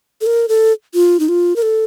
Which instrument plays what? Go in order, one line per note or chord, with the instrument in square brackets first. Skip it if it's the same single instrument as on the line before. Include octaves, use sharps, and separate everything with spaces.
[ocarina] A4
A#4
A4
F4
D#4
F4
A#4
A4